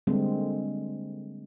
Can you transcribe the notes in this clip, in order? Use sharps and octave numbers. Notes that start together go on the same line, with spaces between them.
D3 G3 G#3 A#3 C4